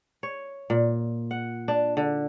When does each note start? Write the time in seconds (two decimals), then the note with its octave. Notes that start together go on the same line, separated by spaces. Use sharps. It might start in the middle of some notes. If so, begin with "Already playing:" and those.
0.23 C#5
0.70 A#2
1.31 F#5
1.68 D4
1.97 D3